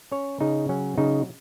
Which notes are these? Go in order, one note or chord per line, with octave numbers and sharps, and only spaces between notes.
C#4 C#5
C#3 D#4
F#3 C#4
C#3 D#4